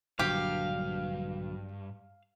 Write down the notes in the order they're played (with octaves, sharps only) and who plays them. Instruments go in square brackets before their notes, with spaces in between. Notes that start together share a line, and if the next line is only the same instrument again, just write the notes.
[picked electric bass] A#1 D3 F#3 [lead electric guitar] G2 [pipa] G4 [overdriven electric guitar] F5